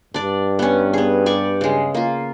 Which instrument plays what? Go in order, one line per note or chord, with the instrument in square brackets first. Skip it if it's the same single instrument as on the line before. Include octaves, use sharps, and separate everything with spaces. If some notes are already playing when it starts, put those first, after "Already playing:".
[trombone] G2 [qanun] D4 D5
[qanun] B3 C#4
B3 G#4
G4 D5 C#6
C#3 G#3
A#3 F4